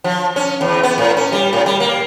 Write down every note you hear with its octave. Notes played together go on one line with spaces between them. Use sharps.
F3
C#4
E2
B3
A2
C#4
G3
A2
G3
A#3